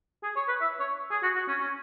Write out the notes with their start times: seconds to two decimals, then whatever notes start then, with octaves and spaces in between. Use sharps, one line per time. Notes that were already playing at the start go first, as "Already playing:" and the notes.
0.23 G#4
0.36 C#5
0.48 B4
0.61 E5
0.80 C#5
1.11 G#4
1.23 F#4
1.36 F#4
1.48 C#4
1.60 C#4